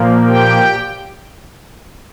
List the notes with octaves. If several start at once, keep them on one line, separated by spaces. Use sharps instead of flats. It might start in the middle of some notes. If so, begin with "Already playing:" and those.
Already playing: A#2 F3 A#3
G4 G5